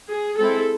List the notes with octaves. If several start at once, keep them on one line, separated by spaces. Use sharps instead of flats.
G#4
G#3 C4 E4 A4